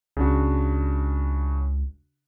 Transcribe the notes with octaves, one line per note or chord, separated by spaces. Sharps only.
C#2 C#3 D4 F#4